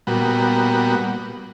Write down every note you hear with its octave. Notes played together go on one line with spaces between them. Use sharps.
A#2 G3 B3 F#4